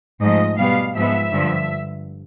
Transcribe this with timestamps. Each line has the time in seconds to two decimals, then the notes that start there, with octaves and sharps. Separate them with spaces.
0.21 G#2 F3 A3 D#5
0.58 B2 G3 B3 F5
0.95 G#2 F3 G#3 B3 E5
1.32 G2 D3 F3